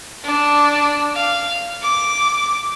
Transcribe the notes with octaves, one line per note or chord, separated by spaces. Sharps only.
D4
F5
D6